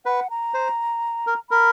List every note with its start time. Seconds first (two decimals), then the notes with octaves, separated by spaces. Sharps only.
0.06 B4 F#5
0.30 A#5
0.54 C5
1.27 A#4
1.50 A#4 B5